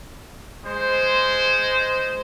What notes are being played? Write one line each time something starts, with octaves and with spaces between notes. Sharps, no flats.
G#3 C5